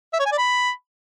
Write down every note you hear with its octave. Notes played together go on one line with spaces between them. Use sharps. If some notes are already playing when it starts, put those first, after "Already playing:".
E5
C#5
G#5
D5
B5